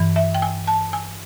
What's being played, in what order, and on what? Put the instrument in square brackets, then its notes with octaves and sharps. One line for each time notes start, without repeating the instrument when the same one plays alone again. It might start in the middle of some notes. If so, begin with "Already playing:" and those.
Already playing: [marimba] G2 E3
E5
G5
G#5
A5
G#5